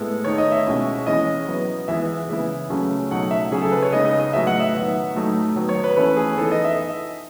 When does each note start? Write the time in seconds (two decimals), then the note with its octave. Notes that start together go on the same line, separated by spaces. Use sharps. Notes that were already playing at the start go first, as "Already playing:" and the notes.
Already playing: A2 G#3 B3 E4 A4
0.24 D#3 A3 D#4 C#5
0.38 D#5
0.52 E5
0.66 B2 G#3 C#4 E4
1.06 E3 G#3 C#4 E4 D#5
1.47 F#3 B3 E4
1.88 E3 G#3 B3 E5
2.29 C#3 E3 G#3 B3 E4
2.70 C#3 F#3 A3 C#4
3.11 B2 F#3 A3 D#4 F#5
3.31 E5
3.51 C#3 F#3 C#4 G#4
3.62 A4
3.72 B4
3.83 C#5
3.92 C#3 G#3 D#4 D#5
4.06 D#5
4.20 D#5
4.33 A2 F#3 B3 E5
4.47 F#5
4.60 E5
4.74 D#3 F#3 B3
5.15 A2 F#3 A3 D#4
5.56 D#3 F#3 B3
5.69 C#5
5.84 B4
5.96 E3 A3 C#4 E4 B4
6.17 G#4
6.38 E3 B3 D#4 A4
6.52 D#5
6.65 E5